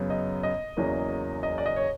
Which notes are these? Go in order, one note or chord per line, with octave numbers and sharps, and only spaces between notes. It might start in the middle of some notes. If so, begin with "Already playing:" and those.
Already playing: F#2 C#3 F#3 B3
D#5
D#5
E2 C#3 F#3 A#3
D#5
D5
D#5
C#5